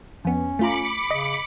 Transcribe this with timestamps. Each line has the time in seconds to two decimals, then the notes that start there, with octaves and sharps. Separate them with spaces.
0.25 F2 B3 C#4
0.59 A3 F4 A#5 B5 D6 C#7
1.11 C#3 D#5